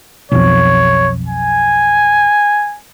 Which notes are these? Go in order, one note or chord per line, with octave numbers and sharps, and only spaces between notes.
B1 F2 C#5
G#5